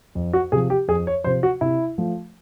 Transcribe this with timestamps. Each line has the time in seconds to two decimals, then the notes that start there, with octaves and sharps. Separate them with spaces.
0.15 F2
0.33 F#4
0.52 C3 F3 G#4
0.70 G4
0.88 F2 G#4
1.07 C#5
1.24 C3 F3 C5
1.43 F#4
1.61 C3 E4
1.98 F3 A3